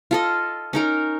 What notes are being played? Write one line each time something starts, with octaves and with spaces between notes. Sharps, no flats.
F4 A4 D#5
C#4 D#4 A#4